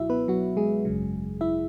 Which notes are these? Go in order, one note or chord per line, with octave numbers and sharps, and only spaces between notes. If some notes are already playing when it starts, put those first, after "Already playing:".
Already playing: C#2 B2 F#3 E4 F#4 E5
B3 B4
F#3 F#4
G#3 G#4
G#1 F#2 C#3 F#3
E4 E5